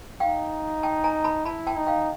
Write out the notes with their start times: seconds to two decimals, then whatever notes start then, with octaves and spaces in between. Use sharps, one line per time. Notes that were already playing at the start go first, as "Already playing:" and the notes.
0.20 D#4 F5 G5
0.83 G5 A5
1.04 G#5 A#5
1.24 A5 B5
1.45 E4 A5 B5
1.67 G5 A5
1.77 D#4
1.87 F5 G5